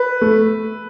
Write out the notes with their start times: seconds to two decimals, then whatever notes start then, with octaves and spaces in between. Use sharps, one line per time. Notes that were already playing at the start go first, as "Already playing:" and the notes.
Already playing: B4
0.21 A3